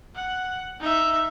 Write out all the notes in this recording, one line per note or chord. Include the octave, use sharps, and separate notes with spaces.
F#5
D#4 E5